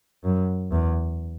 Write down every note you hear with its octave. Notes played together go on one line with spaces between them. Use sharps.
F#2
E2